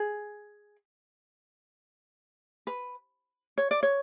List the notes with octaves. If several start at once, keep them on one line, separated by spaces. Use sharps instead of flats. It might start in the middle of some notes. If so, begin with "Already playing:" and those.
Already playing: G#4
B4
C#5
D5
C#5